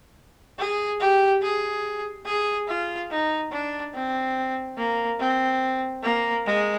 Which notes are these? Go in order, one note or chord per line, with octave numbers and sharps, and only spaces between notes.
G#4
G4
G#4
G#4
F4
D#4
D4
C4
A#3
C4
A#3
G#3